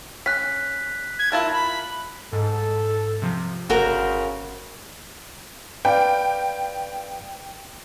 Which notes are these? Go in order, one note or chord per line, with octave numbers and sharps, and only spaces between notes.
C#4 F#6 B6
G#6
E4 F4 A#4 A5
B5
G#2 A4
C3 F3
G1 C#3 F#4 A#4 C5
B4 D5 F5 G5